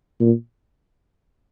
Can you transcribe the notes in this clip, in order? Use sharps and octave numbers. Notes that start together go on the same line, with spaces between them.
A#2